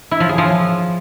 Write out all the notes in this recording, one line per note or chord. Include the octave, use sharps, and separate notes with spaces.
E4
F3
G#4
F3